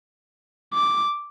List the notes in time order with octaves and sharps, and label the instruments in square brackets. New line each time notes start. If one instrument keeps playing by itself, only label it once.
[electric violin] D6